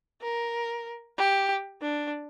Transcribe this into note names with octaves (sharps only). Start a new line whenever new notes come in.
A#4
G4
D4